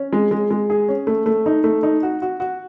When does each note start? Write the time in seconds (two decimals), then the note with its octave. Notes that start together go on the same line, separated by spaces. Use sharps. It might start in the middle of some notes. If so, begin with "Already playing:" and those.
Already playing: C#4
0.13 G#3
0.31 G#3
0.51 G#3
0.70 G#4
0.88 C#4
1.07 A3
1.26 A3
1.46 D#4
1.64 A3
1.83 D#4
2.03 F#4
2.22 F#4
2.40 F#4